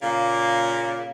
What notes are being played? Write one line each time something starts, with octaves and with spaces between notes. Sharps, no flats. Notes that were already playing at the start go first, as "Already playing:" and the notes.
A#2 C#3 A#3